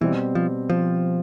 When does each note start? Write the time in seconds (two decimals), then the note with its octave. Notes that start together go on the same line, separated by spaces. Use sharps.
0.01 B2 E3 G3 C4
0.35 F3
0.70 F3